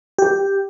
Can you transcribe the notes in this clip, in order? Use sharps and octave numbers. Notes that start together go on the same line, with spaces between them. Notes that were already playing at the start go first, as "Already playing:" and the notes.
G4